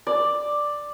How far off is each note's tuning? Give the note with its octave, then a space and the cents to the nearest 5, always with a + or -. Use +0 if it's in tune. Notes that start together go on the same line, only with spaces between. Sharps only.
D5 +5